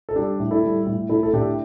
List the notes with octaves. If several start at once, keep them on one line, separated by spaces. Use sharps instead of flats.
A4
G3 D4 G4
A2
E4 A4
G3
A2
A2 E4 A4
A4
A2 D4 G4